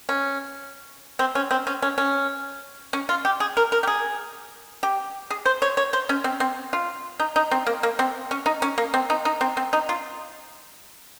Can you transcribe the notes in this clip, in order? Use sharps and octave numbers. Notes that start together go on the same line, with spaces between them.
C#4
C4
C#4
C4
C#4
C#4
C#4
C#4
F4
G4
G#4
A#4
A#4
G4
G#4
G4
G#4
C5
C#5
C#5
C5
C#4
C4
C4
F4
D#4
D#4
C4
A#3
A#3
C4
C#4
D#4
C#4
A#3
C4
D#4
D#4
C4
C4
D#4
F4